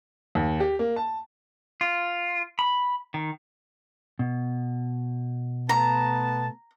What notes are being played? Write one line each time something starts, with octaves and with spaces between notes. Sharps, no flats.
D#2
G4
A#3
A5
F4
B5
D#3
B2
A3 B3 A5 A#5